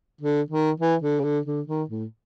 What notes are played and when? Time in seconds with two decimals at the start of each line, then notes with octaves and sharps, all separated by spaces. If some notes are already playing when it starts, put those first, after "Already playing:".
0.21 D3
0.50 D#3
0.80 E3
1.02 D3
1.19 C#3
1.24 D3
1.46 D3
1.67 D#3
1.90 A2